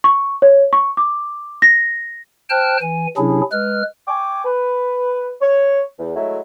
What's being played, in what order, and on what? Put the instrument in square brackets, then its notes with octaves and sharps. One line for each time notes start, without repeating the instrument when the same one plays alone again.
[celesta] C#6
C#5
C#6
D6
A#6
[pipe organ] C5 G5 A5 F6 F#6
E3 G#5
C3 F#3 C#4 D4 E4 G#4
G#3 B4 F6
[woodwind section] G5 G#5 C#6 D6
B4
C#5
E2
F#3 G#3 A3 E4